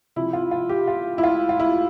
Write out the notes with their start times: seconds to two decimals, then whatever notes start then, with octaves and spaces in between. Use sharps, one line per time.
0.16 C3 F3 E4
0.33 F4
0.51 F4
0.69 G4
0.88 F4
1.18 E4
1.23 F4
1.49 F4
1.60 E4